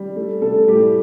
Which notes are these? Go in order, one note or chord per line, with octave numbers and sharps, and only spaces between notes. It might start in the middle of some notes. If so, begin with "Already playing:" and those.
Already playing: G3
A3
C3 A3 A4
A2 G3 G4